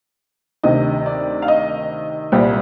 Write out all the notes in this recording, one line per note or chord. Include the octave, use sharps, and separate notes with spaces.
D2 C3 D#3 D#5
D5
F5
D#5
C2 A#2 G3 C4